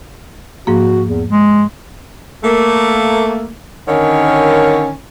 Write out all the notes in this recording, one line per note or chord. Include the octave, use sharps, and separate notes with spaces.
G#2 F3 A#3 F#4
E2
G#3
A3 A#3
D3 D#3 C#4 A#4 C#5